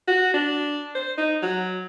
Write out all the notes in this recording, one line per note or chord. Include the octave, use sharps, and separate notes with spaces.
F#4
D4
C5
D#4
F#3